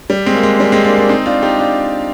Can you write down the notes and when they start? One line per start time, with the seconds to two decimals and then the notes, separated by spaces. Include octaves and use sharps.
0.10 G3
0.26 G#3 C4
0.35 A#3
0.43 G#3
0.60 G3 A#3
0.72 G#3 C4
0.84 A#3 D4
0.97 A#3 D4
1.09 C4 D#4
1.26 D4 F4
1.43 D#4 G4
1.59 D4 F4